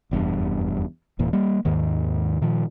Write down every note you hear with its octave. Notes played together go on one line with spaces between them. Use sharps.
F1 E2 G2
E1 E2 A#2
G3 A#3
D#2 G#2 D#3
A#2 D#3 F3